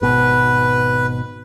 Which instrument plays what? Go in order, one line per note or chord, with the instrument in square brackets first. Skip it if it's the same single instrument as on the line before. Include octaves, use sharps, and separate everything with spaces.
[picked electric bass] G#1 B2 [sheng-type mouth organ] B4